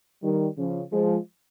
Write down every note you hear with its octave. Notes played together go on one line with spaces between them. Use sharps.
D#3 G3
C#3 F3
F3 G#3